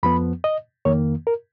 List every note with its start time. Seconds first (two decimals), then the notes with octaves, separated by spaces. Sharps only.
0.03 F2 F3 B3 B5
0.44 D#5
0.85 F2 D#3 A#3 C#5
1.27 A#4